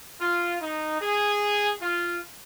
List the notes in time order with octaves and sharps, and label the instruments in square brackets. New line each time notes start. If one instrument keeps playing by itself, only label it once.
[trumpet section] F4
D#4
G#4
F4